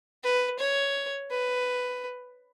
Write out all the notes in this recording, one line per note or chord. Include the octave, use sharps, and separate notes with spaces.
B4
C#5
B4